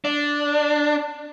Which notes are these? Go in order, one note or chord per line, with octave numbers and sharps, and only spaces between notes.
D4